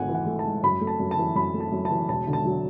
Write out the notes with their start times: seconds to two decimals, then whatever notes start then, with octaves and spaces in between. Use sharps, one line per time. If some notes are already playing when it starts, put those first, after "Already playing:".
Already playing: G#1 G#2 A3 F#5 G#5
0.09 E3
0.14 F#5
0.26 A3
0.39 A5
0.45 G#2
0.63 F#2 B5
0.81 A3
0.87 A5
1.00 F#2
1.11 A5
1.18 E3
1.36 F#2 B5
1.54 A3
1.60 A5
1.72 F#2
1.85 A5
1.91 E3
2.09 E1 A5
2.27 D3
2.33 A5
2.45 F#3